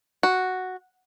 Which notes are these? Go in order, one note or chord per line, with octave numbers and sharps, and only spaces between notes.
F#4